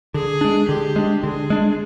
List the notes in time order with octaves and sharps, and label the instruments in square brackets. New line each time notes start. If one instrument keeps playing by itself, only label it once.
[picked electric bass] D3 [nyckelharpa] G#4
[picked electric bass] G#3 D4
[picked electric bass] D3 [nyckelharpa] G4
[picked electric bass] G#3 D4
[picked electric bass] D3 [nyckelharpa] G#4
[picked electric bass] G#3 D4